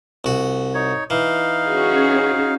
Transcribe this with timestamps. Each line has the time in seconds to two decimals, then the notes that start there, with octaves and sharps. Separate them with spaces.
0.25 C2 F#4
0.74 D#4 C#5
1.10 E3 D#4 F5
1.65 C#4 F#4 G#4